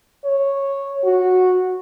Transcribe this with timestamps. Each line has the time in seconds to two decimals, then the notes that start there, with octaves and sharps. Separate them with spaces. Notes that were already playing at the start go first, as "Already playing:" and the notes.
0.25 C#5
1.04 F#4